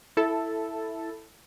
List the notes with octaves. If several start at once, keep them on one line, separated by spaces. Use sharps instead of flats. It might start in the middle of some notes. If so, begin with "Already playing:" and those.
E4 A4